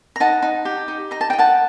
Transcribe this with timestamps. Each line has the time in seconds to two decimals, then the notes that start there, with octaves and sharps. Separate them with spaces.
0.16 A#5
0.20 D#4 F#5 A5
0.42 D#4
0.65 G4
0.88 D#4
1.11 D#4 A#5
1.21 A5
1.30 D#4 G5
1.38 F#5 A5